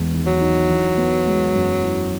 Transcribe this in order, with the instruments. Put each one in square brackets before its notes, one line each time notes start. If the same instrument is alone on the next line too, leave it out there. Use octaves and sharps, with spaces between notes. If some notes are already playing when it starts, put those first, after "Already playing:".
Already playing: [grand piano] E2 G#3
D#3
[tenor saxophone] F#3
[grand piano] D#4
E3
B3
G#3
F#2
E3